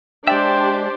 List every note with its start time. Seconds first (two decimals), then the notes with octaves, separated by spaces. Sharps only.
0.27 G#3 D4 G4 C5 D5 E5 G5